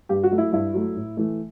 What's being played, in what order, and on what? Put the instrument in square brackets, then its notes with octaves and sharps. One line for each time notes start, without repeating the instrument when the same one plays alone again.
[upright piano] G2 G4
F#4
F#3 A3
E4
G2 E4
F#3 A3
A2
E3 A3